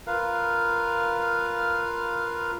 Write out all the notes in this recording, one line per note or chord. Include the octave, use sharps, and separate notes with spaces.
F4 A#4 B4 F5